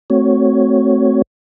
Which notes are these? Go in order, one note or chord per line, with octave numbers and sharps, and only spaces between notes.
A3 C4 F#4 C#5